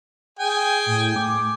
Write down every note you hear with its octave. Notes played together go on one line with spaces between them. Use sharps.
G#4 G5 G#5
A2
D6